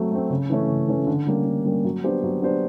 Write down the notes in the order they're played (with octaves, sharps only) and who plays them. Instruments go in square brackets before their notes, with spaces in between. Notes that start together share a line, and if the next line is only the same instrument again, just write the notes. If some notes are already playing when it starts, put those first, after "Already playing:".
Already playing: [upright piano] F#3 A3 C4
A3 C4
C#3
E3 A3 C#4
C#3
E3 A3 C#4
D3
G3 A#3 C#4
D3
G3 A#3 C#4
F#3
B3 D4 G4 C5
F#3
B3 D4 G4 C5